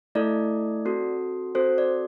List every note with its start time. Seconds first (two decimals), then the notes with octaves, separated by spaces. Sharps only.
0.15 A3 E4 A4 D5
0.85 C4 F#4 A4
1.55 C4 F#4 A4 C5
1.78 D5